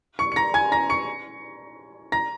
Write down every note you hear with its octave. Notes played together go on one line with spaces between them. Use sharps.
C#6 C#7
C#7
A#5 A#6
G#5 G#6
A#5 A#6
C#6 C#7
A#5 A#6